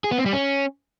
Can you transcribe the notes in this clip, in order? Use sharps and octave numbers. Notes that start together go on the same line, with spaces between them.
G#4
B3
C4
G3
C#4